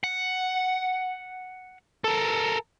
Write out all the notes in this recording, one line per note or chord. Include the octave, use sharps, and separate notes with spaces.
F#5
A4 A#4